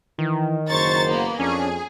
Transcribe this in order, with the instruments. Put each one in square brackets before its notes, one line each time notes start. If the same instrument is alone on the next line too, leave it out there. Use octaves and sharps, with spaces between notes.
[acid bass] D#3 [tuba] E3
[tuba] F#1 [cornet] C5 [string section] A#5 C#6 A6
[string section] A#3 B3
[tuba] F2 [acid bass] C#4 [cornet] D4 [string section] G#4